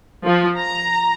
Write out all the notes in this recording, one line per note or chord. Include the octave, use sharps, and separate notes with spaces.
F3
A#5